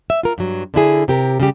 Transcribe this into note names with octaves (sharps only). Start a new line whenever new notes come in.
E5
F4 A#4
G2 F#3
D3 D4 E4 G#4
C3 G4 A#4
C#3 G3 G4